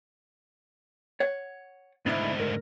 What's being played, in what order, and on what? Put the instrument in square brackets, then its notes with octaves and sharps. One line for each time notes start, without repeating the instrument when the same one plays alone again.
[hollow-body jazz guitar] C#5 F#5
[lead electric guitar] D2 G#2 [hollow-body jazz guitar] B3 D4 E4
[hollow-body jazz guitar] A#4